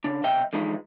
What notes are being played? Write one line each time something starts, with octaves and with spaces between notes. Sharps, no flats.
C#3 D4
B1 C3 D#5 E5 G5
D3 E3 F3 G#3 D#4 B4